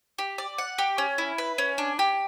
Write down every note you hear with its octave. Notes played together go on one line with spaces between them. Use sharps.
G4
D5
F#5
G4
C#4
E4
B4
C#4
D4
G4